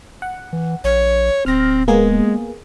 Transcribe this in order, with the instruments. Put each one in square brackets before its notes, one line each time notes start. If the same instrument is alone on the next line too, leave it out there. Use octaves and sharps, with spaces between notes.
[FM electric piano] F#5
[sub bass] E3
[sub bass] A#1 [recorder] C#5
[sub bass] D1 [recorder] C4 [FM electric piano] F6 A#6
[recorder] G#3 [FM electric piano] A#3 B3 G#4